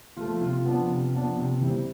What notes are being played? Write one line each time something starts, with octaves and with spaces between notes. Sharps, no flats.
F3 A3 F4
C3 F4
F3 B3 D4
C3
F3 B3 D4
C3
E3 G3 C4